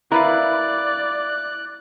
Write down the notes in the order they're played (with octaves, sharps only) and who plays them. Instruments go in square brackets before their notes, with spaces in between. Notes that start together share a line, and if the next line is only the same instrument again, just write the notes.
[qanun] E4 [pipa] A#4 B4 F5 [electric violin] D5 [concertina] F#6